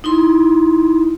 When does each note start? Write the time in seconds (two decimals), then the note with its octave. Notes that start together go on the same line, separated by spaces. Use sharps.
0.04 D#4 E4 C6